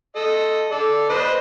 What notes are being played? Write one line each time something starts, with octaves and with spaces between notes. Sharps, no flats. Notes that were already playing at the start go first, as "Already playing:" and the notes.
A4 D#5
A4 D5
B4 C5 D#5